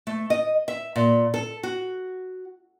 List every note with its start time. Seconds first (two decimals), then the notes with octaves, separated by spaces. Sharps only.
0.07 A3
0.30 D#5
0.68 E5
0.96 A#2
1.34 A4
1.63 F#4